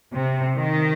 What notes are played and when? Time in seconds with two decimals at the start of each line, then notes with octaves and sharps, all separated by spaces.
0.12 C3
0.57 D#3